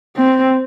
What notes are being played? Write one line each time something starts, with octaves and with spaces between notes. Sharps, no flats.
C4